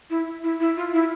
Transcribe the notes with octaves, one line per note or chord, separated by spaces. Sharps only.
E4
E4
E4
F4
E4